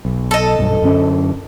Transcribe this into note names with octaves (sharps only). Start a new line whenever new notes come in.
B1
A4 D#5
B1 G2
F#2 D3 C#4